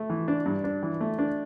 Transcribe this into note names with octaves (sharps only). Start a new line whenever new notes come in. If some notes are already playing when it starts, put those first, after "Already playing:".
Already playing: A3
E3
D4
G2
D4
E3
A3
D4